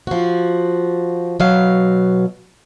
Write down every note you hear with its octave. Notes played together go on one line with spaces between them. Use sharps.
F3 F#4
B2 F#3 F5